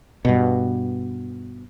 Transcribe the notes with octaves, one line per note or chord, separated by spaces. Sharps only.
G2 B2